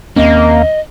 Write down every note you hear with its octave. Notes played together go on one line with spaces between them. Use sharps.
D#2 A#3 C4 C#4 D#5